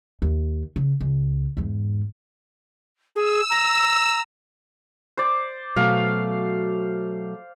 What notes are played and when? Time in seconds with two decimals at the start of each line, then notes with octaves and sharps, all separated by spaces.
0.22 D#2
0.76 C#3
1.01 C#2
1.57 E2 G#2
3.15 G#4 E6
3.50 A#5
5.17 C5 D5
5.76 B2 F#3 A3 F5